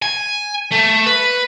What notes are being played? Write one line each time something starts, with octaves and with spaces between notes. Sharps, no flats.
G#5
A3
B4